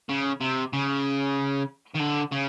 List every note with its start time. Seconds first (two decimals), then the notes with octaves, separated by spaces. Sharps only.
0.09 C#3
0.41 C3
0.73 C#3
1.95 D#3
2.00 D3
2.32 C#3